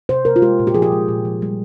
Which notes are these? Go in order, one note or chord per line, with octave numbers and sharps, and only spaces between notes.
C3 C5
C3 A#4
F4
G#3 G4
A#2
G4
F3 G#4
G4
G#3
A#2
F3
G3